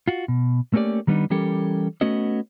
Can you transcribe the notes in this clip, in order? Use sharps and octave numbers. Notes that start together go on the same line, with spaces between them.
F4 F#4
B2
A3 A#3 C#4 G4 D5
D#3 G3 B3 D4 D#4
E3 G3 C#4 G4 A4 A#4
A3 B3 C#4 F#4 D#5